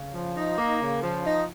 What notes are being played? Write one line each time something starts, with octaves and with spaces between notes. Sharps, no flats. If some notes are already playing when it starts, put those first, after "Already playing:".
Already playing: C#3
F3
D#4
A#3
C#3
F3
D#4